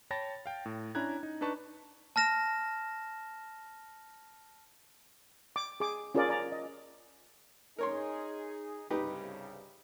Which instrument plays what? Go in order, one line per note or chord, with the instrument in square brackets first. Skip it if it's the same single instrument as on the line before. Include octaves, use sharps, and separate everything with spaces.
[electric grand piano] C#5 G5 A5 B5 A6 A#6
F5 G5
A2
C#4 D4 E4 A#5 F#6 G#6
D#4
D4 D#4 B4 A5 C#6
[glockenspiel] A5 F6 A#6 E7
[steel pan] D6
G#4 D6
C#4 F4 G#4 A#4 D5
D5 A#5
D#5
[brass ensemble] D#4 G#4 [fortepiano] A#4 C#5 C6
[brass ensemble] C2 G2 C#3 [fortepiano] D#4 G4 B4